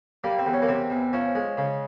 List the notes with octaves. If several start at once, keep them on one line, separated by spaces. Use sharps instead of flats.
G3 A#3
C4
E2
C#4
A#3
C3 C4
E2
F3 C#4
G#3
C#3